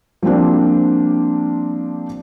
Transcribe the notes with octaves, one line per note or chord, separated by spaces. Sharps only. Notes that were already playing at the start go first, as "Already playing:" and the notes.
F3 G3 A#3 C4 D4